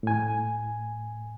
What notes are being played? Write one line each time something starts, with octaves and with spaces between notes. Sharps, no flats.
A2 G#5